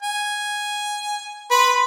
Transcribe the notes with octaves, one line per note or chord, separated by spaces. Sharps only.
G#5
B4 B5 C6